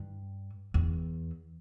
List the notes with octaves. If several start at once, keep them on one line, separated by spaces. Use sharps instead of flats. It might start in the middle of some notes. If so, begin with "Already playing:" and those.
Already playing: G2
E2